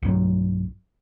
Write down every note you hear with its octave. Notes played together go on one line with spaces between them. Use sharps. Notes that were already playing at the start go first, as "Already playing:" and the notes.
B1 G2 F#3